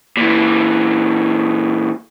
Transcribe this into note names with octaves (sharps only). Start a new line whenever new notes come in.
A#2 E3